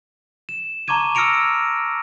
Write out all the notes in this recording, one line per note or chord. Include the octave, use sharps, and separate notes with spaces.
E7
A5 A#5 C#6 D6 G#6 D#7
E6 F6 A#6 C#7 D7 F7